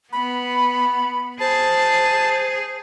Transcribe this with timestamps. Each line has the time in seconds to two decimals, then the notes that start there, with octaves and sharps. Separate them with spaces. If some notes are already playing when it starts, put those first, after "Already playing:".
0.13 B3 B5
1.40 G#4 C5 A5